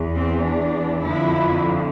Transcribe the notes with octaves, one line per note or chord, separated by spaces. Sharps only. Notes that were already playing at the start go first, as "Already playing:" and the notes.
Already playing: E2 E3
C4
D4
F2 D3 F3 E4